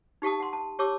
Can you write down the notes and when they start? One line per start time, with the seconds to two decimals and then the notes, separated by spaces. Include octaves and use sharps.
0.22 D#4 G4 F5 A5 D#6
0.40 F#5 C6
0.53 A5
0.79 G4 C#5 A5 D6 E6